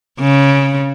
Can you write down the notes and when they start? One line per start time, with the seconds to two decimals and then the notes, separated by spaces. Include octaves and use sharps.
0.20 C#3